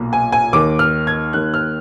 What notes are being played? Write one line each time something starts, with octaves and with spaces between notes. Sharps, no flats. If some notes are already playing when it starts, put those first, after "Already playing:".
Already playing: B1 A#2
G#5
G#5
D#2 D#3 D6
F6
G#6
D#2 D#3 F#6
F6